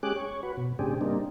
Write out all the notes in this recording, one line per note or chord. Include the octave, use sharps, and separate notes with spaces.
G#3 C#4 G4 G#4 D6 F#6
C#5
F#4 B4
B2
A2 C#3 C4 D4 G4 G#4
G3 A#3 C4 D4 D#4